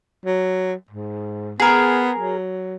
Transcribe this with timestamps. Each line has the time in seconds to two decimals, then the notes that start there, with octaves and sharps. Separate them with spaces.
0.26 F#3
0.90 G#2
1.60 B3 G#4 A#4
2.18 F#3